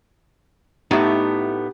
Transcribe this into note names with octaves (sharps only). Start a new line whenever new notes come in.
A2 A3 B3 D#4 E4 G4